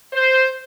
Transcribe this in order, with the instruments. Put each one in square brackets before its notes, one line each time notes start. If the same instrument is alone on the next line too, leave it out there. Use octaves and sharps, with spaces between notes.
[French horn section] C5